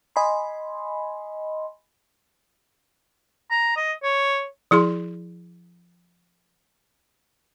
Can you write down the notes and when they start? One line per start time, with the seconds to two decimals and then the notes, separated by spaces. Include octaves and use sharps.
0.16 D#5 G#5 B5 C6
3.51 A#5
3.76 D#5
4.03 C#5
4.71 F3 E4 G#4 C6